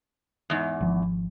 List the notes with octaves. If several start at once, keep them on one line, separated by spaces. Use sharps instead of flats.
E2 G#2
G#1 F3